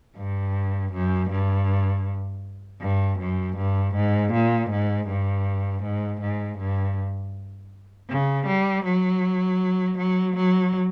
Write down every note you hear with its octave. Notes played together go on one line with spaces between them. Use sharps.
G2
F#2
G2
G2
F#2
G2
G#2
A#2
G#2
G2
G#2
G#2
G2
C#3
G3
F#3
F#3
F#3